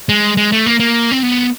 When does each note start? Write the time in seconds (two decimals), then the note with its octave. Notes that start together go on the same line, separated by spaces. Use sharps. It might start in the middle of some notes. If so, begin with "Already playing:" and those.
0.09 G#3
0.37 G#3
0.52 A3
0.66 A#3
0.80 A#3
1.11 C4
1.23 B3